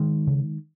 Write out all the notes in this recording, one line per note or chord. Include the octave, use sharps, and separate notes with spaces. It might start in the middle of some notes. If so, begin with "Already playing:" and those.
Already playing: D#3 G#3
C#3